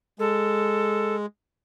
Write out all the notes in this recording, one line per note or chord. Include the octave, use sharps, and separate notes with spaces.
G#3 A4